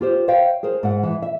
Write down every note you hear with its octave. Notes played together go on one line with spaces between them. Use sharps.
F4 G4 C5
C5 C#5 E5 F5 G5
G#4 A#4 C5 C#5
G#2 F#5
E3
E5